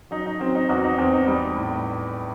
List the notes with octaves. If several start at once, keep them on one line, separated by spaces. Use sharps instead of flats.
F#3 D#4
D#4
F#3 C4
D#4
E2 D#4 F#4
D#4
E2 C4
D#4
G3 D#4
A2